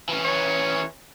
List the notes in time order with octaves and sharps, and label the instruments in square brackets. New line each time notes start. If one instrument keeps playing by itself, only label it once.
[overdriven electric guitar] E3 C#4
[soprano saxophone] C#5